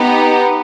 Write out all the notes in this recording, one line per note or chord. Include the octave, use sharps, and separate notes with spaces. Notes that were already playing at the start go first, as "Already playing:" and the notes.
Already playing: B3 D#4 G4